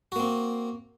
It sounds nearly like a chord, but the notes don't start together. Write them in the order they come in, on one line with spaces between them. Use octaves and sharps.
F#4 A#3 C4